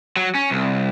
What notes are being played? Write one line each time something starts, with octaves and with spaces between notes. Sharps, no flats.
F#3
C#4
C2